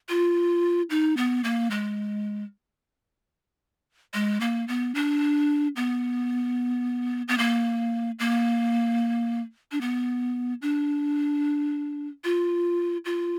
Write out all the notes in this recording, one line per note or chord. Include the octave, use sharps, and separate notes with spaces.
F4
D#4
B3
A#3
G#3
G#3
A#3
B3
D4
B3
B3
A#3
A#3
D4
B3
D4
F4
F4